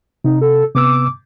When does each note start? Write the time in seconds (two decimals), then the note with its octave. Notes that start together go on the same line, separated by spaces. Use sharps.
0.24 C3 D#4
0.41 A4
0.75 C3 B3 D6 E6